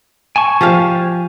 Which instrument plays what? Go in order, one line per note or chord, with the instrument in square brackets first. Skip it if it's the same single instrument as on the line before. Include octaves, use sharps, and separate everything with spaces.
[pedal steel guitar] G#5 A5 C#6
[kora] F3 G4 F5